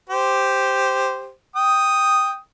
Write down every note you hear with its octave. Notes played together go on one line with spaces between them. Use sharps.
G4 C5
G5 D#6